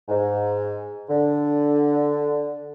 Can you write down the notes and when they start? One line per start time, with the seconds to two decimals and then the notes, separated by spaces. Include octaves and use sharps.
0.08 G#2
1.09 D3